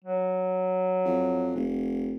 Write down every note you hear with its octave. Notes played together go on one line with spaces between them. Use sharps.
F#3
F2
F1